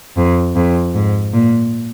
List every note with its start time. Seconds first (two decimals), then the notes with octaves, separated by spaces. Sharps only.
0.17 F2
0.56 F2
0.95 G#2
1.34 A#2